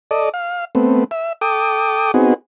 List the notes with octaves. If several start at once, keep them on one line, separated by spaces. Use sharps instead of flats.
A4 D5 D#5
F5
A3 B3 C4
E5
A4 G5 D6 D#6
B3 C4 D#4 F#4 G#4